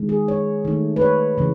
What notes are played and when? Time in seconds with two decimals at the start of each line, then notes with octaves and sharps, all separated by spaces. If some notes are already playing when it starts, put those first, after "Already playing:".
Already playing: D#3 G#3
0.09 G#4
0.28 C#5
0.65 D#3 A3
0.96 B4
1.01 C#5
1.38 C#3 E3